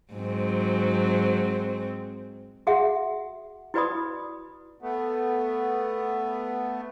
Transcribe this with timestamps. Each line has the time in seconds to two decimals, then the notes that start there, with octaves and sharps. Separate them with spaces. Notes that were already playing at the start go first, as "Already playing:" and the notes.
0.14 G#2 F#3 C4
2.67 F#4 G#4 E5 F#5
3.74 E4 F#4 B4 D5 B5 D#6
4.82 A3 B3